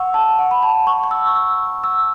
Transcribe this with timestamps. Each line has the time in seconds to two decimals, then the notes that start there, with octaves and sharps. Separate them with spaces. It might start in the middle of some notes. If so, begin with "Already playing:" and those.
Already playing: F#5 C#6 E6
0.14 A5
0.39 F#5
0.51 B5
0.63 A5
0.87 C#6
1.04 C#6
1.11 E6
1.35 E6
1.84 E6